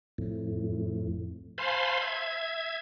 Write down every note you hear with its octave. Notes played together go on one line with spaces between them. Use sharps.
F2 A2
C5 F5 G#5 A5 B5 C6
E5 G#6